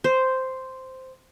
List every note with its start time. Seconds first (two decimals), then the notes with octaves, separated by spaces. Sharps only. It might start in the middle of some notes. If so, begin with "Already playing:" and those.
0.04 C5